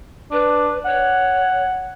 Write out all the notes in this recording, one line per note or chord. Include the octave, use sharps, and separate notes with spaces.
D4 B4
C#5 F#5